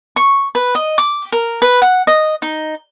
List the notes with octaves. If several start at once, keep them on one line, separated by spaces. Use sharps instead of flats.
C#6
B4
D#5
D6
A#4
B4
F#5
D#5
D#4